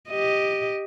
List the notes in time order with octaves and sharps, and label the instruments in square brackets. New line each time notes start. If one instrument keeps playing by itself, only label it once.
[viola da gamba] G4 D#5